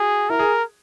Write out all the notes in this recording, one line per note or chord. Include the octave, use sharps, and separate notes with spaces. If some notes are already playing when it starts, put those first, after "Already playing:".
Already playing: F#4 G#4
E4 A#4
G#4